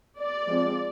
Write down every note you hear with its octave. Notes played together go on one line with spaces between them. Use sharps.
D5
F3 G#3 C4